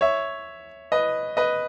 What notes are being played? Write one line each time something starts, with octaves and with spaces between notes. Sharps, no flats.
C#5 E5
B4 D#5
B4 D#5